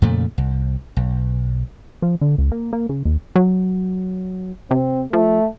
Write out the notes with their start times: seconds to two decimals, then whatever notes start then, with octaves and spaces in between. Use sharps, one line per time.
0.02 F2 A#2 C#3 A3
0.38 C2
0.97 B1
2.02 F3
2.21 D3
2.38 C#2
2.52 A#3
2.73 A#3
2.89 C#3
3.05 D#2
3.36 F#3
4.71 C3 C4
5.13 F3 A3